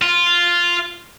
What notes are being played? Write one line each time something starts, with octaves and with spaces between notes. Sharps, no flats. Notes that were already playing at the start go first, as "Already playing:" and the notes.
F4